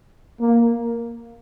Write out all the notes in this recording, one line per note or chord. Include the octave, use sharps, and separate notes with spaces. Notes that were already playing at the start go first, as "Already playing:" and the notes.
A#3